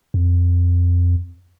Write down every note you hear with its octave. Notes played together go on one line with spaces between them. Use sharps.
F2